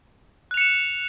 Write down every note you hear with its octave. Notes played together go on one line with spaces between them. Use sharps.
F#6 C#7 E7 F7